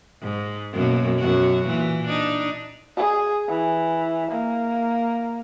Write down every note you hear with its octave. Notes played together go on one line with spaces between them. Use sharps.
G#2
F#2 B2 A#3
F#2 B2 F#4
A#2 E3
D4 D#4
G#4
E3
A#3